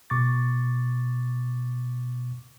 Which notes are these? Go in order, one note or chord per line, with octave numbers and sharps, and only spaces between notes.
B2 C#6 D6 A6